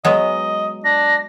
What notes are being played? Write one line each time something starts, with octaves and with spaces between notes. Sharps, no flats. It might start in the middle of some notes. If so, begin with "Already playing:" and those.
F#3 G#3 B3 D#5
D4 A#6